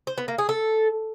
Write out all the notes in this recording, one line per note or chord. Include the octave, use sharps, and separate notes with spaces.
C5
B3
A#3
G#4
A4